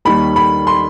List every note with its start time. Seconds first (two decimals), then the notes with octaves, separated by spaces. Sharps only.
0.05 D#2 D#3 G3 B5
0.36 B5
0.67 C6